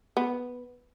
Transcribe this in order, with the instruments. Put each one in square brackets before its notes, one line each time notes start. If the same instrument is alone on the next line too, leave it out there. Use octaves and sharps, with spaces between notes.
[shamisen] B3